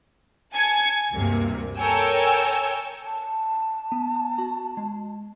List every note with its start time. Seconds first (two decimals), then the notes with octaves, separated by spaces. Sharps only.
0.52 G#5 A5 G#6 C#7
1.13 D2 G2 C3 A#3
1.77 A4 A#4 C#5 G5 G#5 E6
3.04 A5
3.92 B3
4.38 F#4
4.77 G#3